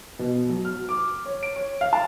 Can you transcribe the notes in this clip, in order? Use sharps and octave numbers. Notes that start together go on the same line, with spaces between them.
B2
F#3
F6
D6
C#5
D7
C#5
F5
A5